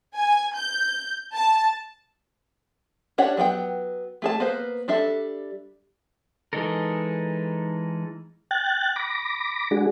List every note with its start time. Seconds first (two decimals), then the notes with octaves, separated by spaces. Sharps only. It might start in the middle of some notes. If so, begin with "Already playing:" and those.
0.15 G#5
0.56 G6
1.34 A5
3.18 C#4 D4 G4 C#5 F#5
3.37 F#3 B3 F#5 G5
4.22 A3 G#4 A5
4.40 A#3 B3 B4 C5
4.88 G3 D4 A4 E5
6.53 E3 G#3 D#4 A4 A#4
8.51 G5 F#6 A6
8.96 B5 D6 A#6
9.71 G#3 D4 F#4 G#4